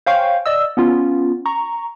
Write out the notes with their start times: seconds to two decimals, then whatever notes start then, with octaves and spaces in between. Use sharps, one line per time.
0.06 C5 C#5 F5 G5 G#5 C#6
0.46 D5 D#5 E6
0.77 B3 C#4 F4
1.46 A#5 C#6